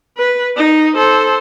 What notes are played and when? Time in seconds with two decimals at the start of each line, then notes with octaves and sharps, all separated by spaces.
0.17 B4
0.57 D#4
0.95 A4 C5